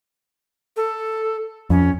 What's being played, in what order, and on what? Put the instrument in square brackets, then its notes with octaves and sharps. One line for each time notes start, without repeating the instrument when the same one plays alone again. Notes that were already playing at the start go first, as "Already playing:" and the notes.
[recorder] A4
[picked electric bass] F2 [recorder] C#4